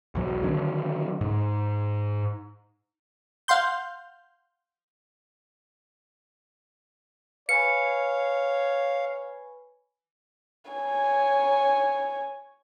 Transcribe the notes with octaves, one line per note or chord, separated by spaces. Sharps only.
B1 E2 F#3
D3 D#3 F#3 D4
G#2
F5 F#5 C6 G6
B4 C#5 F5 G#5 B5 C#7
C#5 G#5